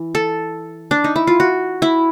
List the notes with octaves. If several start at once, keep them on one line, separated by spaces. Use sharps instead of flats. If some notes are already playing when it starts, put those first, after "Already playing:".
Already playing: E3
A4
D4
D#4
E4
F4
F#4
E4